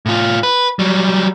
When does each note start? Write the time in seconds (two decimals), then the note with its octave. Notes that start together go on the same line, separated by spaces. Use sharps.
0.06 A2 F4
0.43 B4
0.79 F#3 G3